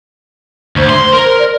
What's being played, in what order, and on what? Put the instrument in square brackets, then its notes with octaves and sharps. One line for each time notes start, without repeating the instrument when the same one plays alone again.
[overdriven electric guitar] D2 [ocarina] C5
[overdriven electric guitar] C6
A#4
[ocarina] D5